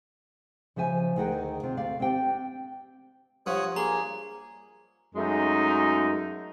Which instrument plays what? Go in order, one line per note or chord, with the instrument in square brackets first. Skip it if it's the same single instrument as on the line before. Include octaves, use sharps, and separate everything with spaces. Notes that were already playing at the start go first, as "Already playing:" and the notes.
[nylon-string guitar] C#3 F3 C5 E5 G#5
D2 D#3 G#4 A#4 F#5 G5
C3 C4 F4
D2 D5 F5
C4 D4 G4 G5
[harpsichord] G2 F3 [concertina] C#5 D#6 [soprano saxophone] F#5
[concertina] A#3 [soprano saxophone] G#4 [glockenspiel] A#5
[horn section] F#2 G#3 A3 D#4